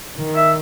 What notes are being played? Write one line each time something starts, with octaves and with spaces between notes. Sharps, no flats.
D#3
E5